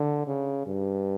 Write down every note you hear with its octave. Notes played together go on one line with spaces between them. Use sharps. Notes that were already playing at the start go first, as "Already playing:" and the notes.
Already playing: D3
C#3
G2